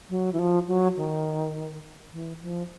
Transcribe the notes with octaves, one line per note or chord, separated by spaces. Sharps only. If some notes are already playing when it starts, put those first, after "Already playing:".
F#3
E3
F3
F#3
D#3
E3
F3